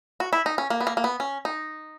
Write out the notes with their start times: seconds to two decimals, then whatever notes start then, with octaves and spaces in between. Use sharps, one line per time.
0.20 F#4
0.33 E4
0.46 D#4
0.58 C#4
0.70 A#3
0.81 B3
0.87 A#3
0.97 A#3
1.04 B3
1.20 C#4
1.45 D#4